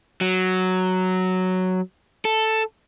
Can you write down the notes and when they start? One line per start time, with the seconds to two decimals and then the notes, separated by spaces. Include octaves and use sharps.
0.21 F#3
2.25 A4